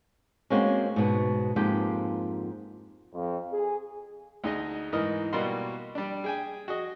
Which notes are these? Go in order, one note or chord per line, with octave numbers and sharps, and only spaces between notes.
G#3 A#3 C4 C#4 D#4 F#4
G#2 B2
F2 G#2 A#3 G4
F2
G#4
D2 D#4 G#4 D#5
G#2 E3 A#4 D#5 F6
B2 G3 A#3 F#4 C6
G3 D4
G#4 G5 G#5
F#4 G#4 D#5